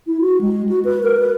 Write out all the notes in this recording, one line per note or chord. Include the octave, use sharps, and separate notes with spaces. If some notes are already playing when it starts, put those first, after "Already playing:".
E4
F#4
G#3
F#4
B4
A#4
B4